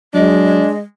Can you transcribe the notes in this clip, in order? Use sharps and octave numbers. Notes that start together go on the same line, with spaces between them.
F#3 G#3 D4 D#5